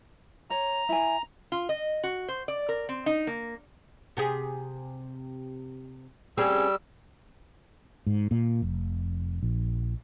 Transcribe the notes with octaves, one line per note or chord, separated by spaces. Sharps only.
C#5 A#5
E4 G#5
F4
D#5
F#4
C5
D5
A#4
C4
D#4
A#3
C3 G4 G#4
G3 C4 C#4 G#4 E6
G#2
A#2
F1
A#1